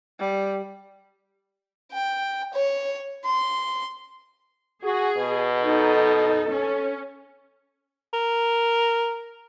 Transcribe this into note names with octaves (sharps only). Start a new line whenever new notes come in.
G3
G5
C#5
C6
F#4 G#4
B2
D#4 A4
C#4
A#4